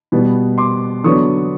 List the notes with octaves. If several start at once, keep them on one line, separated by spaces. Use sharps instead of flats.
B2 G3 B3
C6 D6
D3 F#3 B3 D4 C#6 D#6